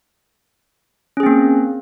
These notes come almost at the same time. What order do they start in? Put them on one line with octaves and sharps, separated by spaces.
C#4 G#4 C4 A#3